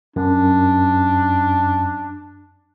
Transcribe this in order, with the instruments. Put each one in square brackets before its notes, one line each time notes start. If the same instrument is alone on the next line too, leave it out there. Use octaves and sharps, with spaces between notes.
[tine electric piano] F#2 [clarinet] D4